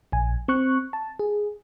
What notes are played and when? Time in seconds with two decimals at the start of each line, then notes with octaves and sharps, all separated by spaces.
0.12 A#1 G#5
0.48 C4 C#6 F#6
0.93 A5
1.19 G#4